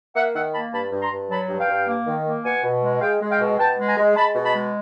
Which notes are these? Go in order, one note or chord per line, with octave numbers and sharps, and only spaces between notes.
A#3 E5 F#5
D#3 E5 F#5
A#3 A5 B5
G2 A5 B5
G2
A#5 C6
G2
F#3 A5 B5
G2
F5 G5
G2
A#3
D#3
A#3
B2 F#5 G#5
B2
G#3
G#3 F5 G5
G#3
F5 G5
B2
B2 G5 A5
G#3
G#5 A#5
G#3
G#3 A5 B5
B2
A5 B5
G#3